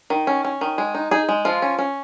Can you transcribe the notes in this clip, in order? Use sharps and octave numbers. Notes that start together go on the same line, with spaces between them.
D#3
C#4
C#4
D#3
G#3
D#4
D#4 G#4
G#3
F3 F4
C#4
C#4